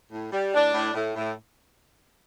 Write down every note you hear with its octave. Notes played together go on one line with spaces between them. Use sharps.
A2
G3
A2 D4
A2
A2
A2